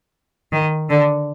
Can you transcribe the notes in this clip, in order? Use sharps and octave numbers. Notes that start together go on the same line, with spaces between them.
D#3
D3